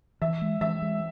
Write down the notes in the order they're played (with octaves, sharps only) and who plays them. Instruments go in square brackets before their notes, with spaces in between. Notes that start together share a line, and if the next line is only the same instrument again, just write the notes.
[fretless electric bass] E3 [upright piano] E5
[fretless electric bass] G#3
[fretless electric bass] E3 [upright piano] E5
[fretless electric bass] G#3